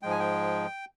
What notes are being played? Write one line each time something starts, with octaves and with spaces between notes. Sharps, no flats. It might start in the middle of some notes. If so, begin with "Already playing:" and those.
G#2 F3 G#3 G5
G#5
G5